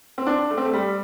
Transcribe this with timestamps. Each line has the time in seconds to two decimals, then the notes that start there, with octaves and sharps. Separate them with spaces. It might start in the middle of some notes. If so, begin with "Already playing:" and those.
0.18 C4
0.27 D4
0.51 A3
0.57 C4
0.65 A3
0.73 G3